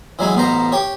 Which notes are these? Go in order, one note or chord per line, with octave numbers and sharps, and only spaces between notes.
E3 F#3 G#3
A1 B2 C5 A#5
G4 C#5